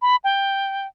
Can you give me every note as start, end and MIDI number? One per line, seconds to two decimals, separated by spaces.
0.02 0.16 83
0.24 0.87 79